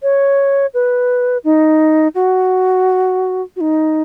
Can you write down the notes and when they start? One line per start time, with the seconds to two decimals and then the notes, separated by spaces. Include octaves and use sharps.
0.03 C#5
0.74 B4
1.44 D#4
2.15 F#4
3.56 F#4
3.61 D#4